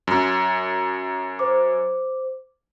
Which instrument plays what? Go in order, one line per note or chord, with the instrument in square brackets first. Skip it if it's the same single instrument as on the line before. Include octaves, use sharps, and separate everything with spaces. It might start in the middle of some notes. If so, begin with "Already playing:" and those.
[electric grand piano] F#2
[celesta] C5 D6